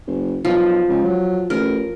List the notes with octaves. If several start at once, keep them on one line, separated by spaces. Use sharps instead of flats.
F#1
B1 F3
C#2
F#3
A1 A#4